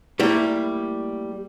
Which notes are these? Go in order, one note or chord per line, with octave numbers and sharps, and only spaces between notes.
G3 A3 A#3 E4